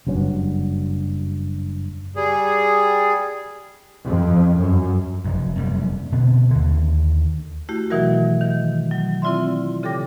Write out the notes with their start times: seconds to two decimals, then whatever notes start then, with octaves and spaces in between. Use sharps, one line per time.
0.07 F#1 G2 F#3 C#4
2.16 G3 G#4
4.04 F2
4.58 F#2
5.24 F1 F#2
5.56 F1 F#2 G3 A#3
6.12 B2 D3 C4
6.51 D#2 D3
7.69 A3 E4 F#4 G4
7.90 B2 D#3 E3 F#3 F#4 A#4
8.41 D#3
8.91 F#3
9.22 C4 E4 F4 D5 E5 C6
9.83 C#3 G4 A4 G5 D6 A#6